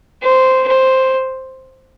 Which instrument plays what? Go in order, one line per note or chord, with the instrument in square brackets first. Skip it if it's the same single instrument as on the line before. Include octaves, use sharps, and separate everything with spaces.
[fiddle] C5
C5